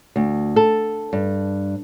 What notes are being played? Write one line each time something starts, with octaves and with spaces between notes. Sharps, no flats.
D2
A4
G2